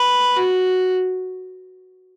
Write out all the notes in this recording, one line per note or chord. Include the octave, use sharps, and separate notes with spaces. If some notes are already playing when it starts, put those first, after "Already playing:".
Already playing: B4
F#4